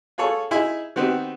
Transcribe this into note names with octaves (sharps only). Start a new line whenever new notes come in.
F4 G#4 A4 C#5
D#4 E4 G#4 E5 G#5
D#3 B3 C4 F#4 G4 B4